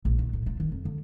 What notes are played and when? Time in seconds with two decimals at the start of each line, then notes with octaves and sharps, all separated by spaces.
0.05 A#1
0.19 D#3
0.33 A2
0.46 F4
0.60 D#3
0.72 F2
0.85 D3